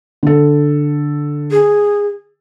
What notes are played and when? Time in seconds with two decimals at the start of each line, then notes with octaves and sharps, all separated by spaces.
0.23 D3 A4
1.51 G#4